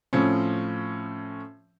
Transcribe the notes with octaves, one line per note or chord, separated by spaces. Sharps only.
A2 F3 C4 C#4